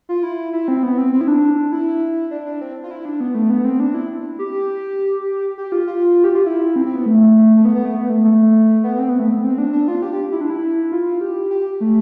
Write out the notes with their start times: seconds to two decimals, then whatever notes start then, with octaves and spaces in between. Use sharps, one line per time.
0.09 F4
0.23 E4
0.53 E4
0.68 C4
0.83 B3
0.98 C4
1.13 C4
1.21 E4
1.28 D4
1.72 E4
2.31 D4
2.46 D4
2.61 C4
2.84 F4
2.91 E4
3.05 D4
3.21 B3
3.35 A3
3.50 B3
3.65 C4
3.80 D4
3.94 E4
4.39 G4
5.58 G4
5.72 F4
5.87 F4
6.24 G4
6.35 F4
6.46 E4
6.76 C4
6.86 C4
6.96 B3
7.06 A3
7.57 A3
7.65 B3
7.75 B3
7.85 A3
7.95 B3
8.10 A3
8.24 A3
8.84 B3
8.99 C4
9.09 B3
9.19 A3
9.30 B3
9.44 C4
9.58 D4
9.73 D4
9.88 F4
10.02 G4
10.13 G4
10.32 E4
10.41 D4
10.50 E4
10.92 F4
11.21 G4
11.51 G4
11.80 A3